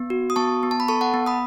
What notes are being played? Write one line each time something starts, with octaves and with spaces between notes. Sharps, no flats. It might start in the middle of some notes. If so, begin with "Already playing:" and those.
Already playing: B3
F#4
D#6
B3 A5 C#6
B3
A5
B5
A4 A5 C#6
F#5 A5
B3
B5 D#6